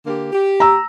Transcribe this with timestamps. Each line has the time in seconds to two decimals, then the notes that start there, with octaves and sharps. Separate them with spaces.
0.06 D3 A#3 G4
0.31 G4
0.60 A#5 E6